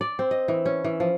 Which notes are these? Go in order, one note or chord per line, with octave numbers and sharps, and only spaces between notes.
D5
C4
D#5
E3
C#4
E3
F3